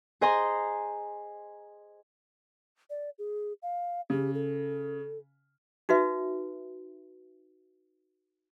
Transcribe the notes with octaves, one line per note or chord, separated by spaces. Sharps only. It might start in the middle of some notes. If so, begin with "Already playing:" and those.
G#4 C5 D#5 G#5 A#5 C6
D5
G#4
F5
C#3 G4
A4
D#4 F#4 B4 E5